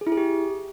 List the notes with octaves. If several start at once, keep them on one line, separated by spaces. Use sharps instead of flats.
G#4
E4
G#4
G4